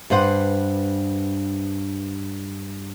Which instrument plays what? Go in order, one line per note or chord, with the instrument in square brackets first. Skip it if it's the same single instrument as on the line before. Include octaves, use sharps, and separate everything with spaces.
[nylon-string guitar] G2 B4 C5 F#5